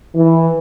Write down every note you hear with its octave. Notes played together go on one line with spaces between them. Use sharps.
E3